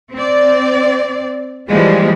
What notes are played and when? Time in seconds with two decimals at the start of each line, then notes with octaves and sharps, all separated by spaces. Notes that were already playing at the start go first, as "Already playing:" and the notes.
0.12 C4 D5
1.67 E3 F3 G3 G#3 A#3